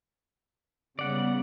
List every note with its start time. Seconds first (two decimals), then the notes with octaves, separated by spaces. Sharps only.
0.99 C#3 G3 B3 D5 F#5